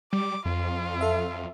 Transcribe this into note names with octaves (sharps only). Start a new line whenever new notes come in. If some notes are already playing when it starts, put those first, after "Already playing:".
G3 D6
F2 F4
A4 E5